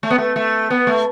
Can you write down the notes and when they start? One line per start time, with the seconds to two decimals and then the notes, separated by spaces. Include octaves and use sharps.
0.03 A3
0.10 B3
0.18 A3
0.36 A3
0.70 B3
0.87 A3